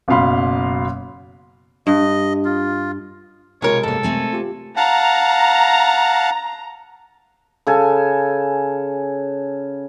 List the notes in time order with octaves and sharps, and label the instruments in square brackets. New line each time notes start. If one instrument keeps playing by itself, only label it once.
[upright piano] F#1 F#2 B2 F5 B5 C6
[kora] G2 [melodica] D#5
[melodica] F4
[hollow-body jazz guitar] B1 A#4 [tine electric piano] C3 G#3 [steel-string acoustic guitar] F4 [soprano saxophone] C#5
[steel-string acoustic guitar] G#2 A#3 [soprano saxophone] A4
[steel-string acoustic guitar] A3 C4 G#5
[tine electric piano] F4 G4
[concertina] F5 F#5 A5 [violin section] A#5
[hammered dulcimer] C#3 A4 G#5